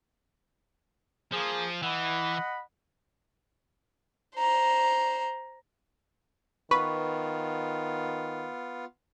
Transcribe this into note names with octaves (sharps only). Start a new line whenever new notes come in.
F3 A#3 G#4
E3 D#5 F#5 B5
C5 A#5
D#3 B3 F4 B4 C#6